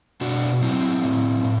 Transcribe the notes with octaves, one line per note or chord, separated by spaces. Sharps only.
B2 D4 F#4
F#3 C4 E4
A2
A2